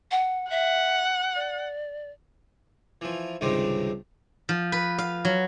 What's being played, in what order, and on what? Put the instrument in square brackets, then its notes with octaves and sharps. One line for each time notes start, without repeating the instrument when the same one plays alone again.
[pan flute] F#5
[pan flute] E5 [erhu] F#5
[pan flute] D5
[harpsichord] E3 F3
C#2 G2 C3 D#3 C4
[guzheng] F3
B4
F5
F#3